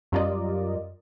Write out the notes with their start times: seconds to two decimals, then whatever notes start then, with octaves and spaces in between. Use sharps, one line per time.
0.12 F#2 G3 F4 A#4 D5 D#5